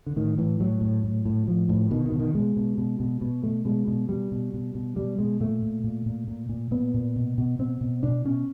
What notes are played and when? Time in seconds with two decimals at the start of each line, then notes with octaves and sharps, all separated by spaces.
0.06 D3
0.16 A2 D#3
0.38 A2 E3
0.60 A2 F#3
0.81 A2
1.04 A2
1.25 A2
1.47 A2 F3
1.69 A2
1.91 B2 D#3
2.05 D#3
2.12 B2
2.19 D#3
2.35 B2 G#3
2.57 B2
2.78 B2
3.00 B2
3.21 B2
3.43 B2 A3
3.65 B2 G#3
3.88 B2
4.09 B2 G3
4.32 B2
4.54 B2
4.75 B2
4.96 B2 G3
5.19 B2 G#3
5.40 A#2 A3
5.62 A#2
5.84 A#2
6.06 A#2
6.28 A#2
6.49 A#2
6.71 A#2 B3
6.94 A#2
7.16 B2
7.38 B2
7.59 B2 C4
7.81 B2
8.03 B2 D4
8.25 B2 C#4